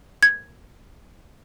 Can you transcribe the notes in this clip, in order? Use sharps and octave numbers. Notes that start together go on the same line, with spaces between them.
G#6